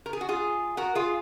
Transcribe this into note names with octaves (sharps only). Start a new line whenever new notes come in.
A#4
G#4
F#4
F4 G#4
F#4 A#4
F4 G#4